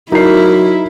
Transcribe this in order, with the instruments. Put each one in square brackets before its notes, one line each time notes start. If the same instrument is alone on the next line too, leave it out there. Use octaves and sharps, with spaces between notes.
[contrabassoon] F#3 [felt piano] D#4 C7 [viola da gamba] E4 [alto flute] A#4